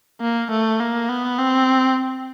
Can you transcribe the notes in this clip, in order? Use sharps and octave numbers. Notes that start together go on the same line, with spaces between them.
A#3
A3
A#3
B3
C4